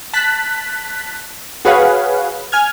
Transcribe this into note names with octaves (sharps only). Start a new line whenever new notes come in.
A5 F#6 B6
F#4 G#4 B4 C#5 F5 F#5
G#5 F6 G#6